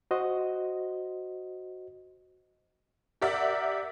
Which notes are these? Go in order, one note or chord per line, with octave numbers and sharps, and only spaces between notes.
F#4 C5 D#5
G4 A#4 D5 E5 F#5